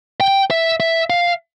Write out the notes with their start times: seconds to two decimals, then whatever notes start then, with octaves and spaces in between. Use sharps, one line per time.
0.20 G5
0.51 E5
0.80 E5
1.10 F5